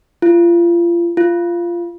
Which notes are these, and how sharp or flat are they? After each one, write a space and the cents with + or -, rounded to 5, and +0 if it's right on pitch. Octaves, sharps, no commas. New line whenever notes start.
F4 -30
F4 -15